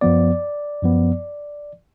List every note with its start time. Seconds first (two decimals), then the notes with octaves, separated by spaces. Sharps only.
0.01 F#2 F3 B3 D5
0.82 F#2 F3 B3